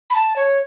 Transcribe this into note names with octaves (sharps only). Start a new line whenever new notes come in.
B5
A5
C#5